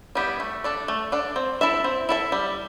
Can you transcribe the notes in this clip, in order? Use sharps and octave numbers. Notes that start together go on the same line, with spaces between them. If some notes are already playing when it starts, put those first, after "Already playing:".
G3 B3 E4 G4
A3
D4 A4 D5
A3
D4 A4 D5
C4
E4 A4 E5
C4
E4 A4 E5
G3